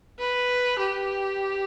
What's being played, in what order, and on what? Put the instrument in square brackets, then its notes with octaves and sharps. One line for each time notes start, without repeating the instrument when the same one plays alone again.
[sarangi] B4
G4